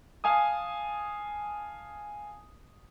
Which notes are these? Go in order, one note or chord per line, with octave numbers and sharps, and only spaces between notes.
F5 G#5 A5 D#6